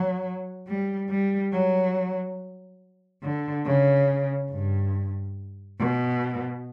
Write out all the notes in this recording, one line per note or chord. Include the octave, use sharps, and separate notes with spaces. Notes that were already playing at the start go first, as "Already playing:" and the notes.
Already playing: F#3
G3
G3
F#3
D3
C#3
G2
B2